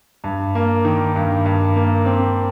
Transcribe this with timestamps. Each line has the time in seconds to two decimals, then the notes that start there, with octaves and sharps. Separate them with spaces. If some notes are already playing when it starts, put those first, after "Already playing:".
0.24 G2
0.55 A#3
0.85 D#3
1.16 G2
1.45 G2
1.76 A#3
2.06 C4